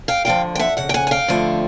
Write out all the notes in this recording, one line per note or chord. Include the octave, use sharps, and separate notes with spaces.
F5 G5
D2 D3 F3 F5 G5
G5
E5 F#5
F2 C#3 F#5
G5
F#5 G#5
G#5
F5 G5
F2 D3 F3 A3